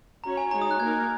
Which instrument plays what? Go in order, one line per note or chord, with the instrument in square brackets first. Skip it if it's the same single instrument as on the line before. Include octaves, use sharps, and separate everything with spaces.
[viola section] C#4 F#4 C#5 [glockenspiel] A#5
[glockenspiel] G#5
[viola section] G#3 D#4 F#4 C#5 [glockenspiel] A#5
[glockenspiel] D#6
F#6
[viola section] A#3 D#4 A#4 [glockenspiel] G#6